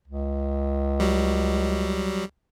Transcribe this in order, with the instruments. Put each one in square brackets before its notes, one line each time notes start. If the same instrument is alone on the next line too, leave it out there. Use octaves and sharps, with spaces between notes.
[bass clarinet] C#2
[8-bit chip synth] F#3 G3